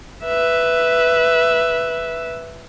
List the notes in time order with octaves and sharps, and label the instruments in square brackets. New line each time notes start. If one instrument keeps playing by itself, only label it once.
[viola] B4 E5